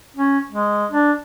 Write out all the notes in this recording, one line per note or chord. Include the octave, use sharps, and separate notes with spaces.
C#4
G#3
D4